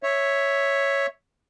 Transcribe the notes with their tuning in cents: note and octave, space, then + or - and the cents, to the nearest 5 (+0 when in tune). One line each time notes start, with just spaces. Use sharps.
C#5 +0 E5 +0